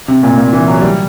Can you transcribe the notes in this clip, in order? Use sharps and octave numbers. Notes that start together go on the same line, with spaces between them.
C3
A#2
A#2
E3
F#3
G3